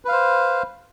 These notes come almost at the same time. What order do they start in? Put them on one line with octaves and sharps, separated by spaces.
B4 F5 C5